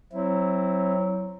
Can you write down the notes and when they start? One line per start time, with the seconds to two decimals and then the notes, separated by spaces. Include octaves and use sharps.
0.12 F#3 C4 E4